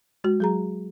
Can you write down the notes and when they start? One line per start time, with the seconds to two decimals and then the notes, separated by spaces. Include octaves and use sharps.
0.24 G#3 F#4
0.40 F#3 G#4 A#5